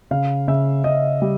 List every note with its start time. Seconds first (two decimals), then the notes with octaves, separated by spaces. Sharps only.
0.11 C#3 F5
0.48 C#3 E5
0.84 C#3 D#5
1.22 G3